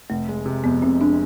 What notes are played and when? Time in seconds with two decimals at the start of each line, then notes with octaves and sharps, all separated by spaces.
0.10 F1 A3
0.29 G#3
0.46 C3
0.64 F2 B3
0.82 F1 C4
1.01 G#3 D4